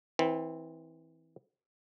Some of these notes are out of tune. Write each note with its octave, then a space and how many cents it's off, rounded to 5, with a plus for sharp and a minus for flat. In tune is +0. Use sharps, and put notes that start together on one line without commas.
E3 -25 C4 +0